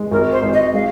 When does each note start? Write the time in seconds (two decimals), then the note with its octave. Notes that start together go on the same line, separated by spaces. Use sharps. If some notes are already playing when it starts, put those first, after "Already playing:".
Already playing: G#3
0.11 G#1 A#4
0.32 C5
0.42 G#1
0.53 D#5
0.74 G#3 F5